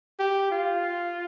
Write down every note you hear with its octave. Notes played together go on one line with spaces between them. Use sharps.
G4
F4